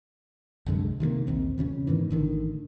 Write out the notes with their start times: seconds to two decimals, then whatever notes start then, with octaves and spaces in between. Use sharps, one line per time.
0.66 C2 F#2 D3 G#3
1.00 C3 D#3 G#3 A#3
1.27 A#1 D#2 C4
1.58 E1 C#3 C4 C#4
1.87 G#2 B2 D#3 E3
2.10 A1 D3 D#3